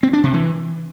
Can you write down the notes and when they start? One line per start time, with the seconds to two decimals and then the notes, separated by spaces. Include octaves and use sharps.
0.03 C4
0.13 D4
0.23 C3
0.34 E3